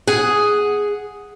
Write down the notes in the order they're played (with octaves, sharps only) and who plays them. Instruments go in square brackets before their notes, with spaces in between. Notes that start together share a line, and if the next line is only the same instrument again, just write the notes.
[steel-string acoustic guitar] G#4 F#5